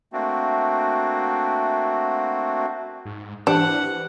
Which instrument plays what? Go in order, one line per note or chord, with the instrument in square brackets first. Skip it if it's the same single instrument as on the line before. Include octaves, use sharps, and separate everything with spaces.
[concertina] A3 A#3 C4 D4 F#4
[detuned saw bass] G#2
[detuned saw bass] E3 [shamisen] D4 [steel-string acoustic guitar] G4 B4 C5 [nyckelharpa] F#5